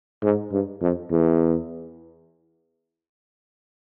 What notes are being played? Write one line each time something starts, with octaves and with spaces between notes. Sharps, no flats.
G#2
G2
F2
E2